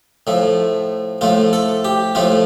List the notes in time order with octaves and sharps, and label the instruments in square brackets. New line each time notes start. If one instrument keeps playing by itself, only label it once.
[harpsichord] A2 F3 A3
A2 F3 A3 F4
A4
G4
A2 F3 A3 F4